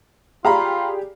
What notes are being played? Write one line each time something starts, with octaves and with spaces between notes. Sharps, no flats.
F4 G4 G#4 D5 F5 A#5 B5